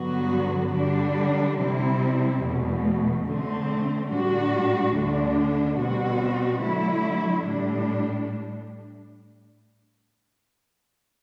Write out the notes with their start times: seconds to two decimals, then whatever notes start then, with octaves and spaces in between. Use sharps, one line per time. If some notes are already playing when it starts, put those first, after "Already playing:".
Already playing: G2 D3 F#3 B3 F#4
0.75 D3 G3 D4
1.59 C3 G3 C4 E4
2.42 E2 B2 A3
3.27 D3 A3 C4
4.10 A2 G3 D4 F#4
4.95 D2 D3 A3 D4
5.78 B2 G3 C4 F#4
6.62 D3 F#3 A3 E4
7.45 A2 G3 D4